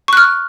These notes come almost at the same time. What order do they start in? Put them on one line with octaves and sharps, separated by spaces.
C#6 F#6 F6